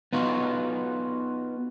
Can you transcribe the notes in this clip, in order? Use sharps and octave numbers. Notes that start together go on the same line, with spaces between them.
B3 D#4 F4 F#4